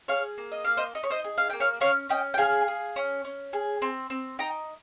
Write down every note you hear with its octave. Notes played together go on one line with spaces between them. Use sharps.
G#4 C#5 F5
A#3
D#5
A#3 F5
C5 D#5
D#4 D#5
C#5
C5 D#5
G#4
F5
A#3 G5
C#5 F5
C#4 C#5 F5
C#4 D#5 G5
G5
G#4 F5 G#5
G#4
C#4
C#4
G#4
C4
C4
D#4 G5 A#5